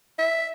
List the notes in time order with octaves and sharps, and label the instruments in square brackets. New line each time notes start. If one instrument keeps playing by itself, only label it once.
[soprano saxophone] E5